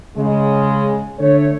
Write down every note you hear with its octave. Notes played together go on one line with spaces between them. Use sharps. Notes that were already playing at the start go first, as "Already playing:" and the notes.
C#3 G#3
D3 A3 C#5